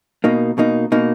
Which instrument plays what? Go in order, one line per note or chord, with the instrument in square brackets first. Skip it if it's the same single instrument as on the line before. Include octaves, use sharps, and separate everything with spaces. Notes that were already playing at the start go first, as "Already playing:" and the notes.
[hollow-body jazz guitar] B2 A#3 D#4
B2 A#3 D#4
B2 A#3 D#4